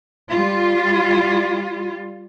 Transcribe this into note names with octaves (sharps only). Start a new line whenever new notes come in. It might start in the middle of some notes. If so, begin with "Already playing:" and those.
G3 F4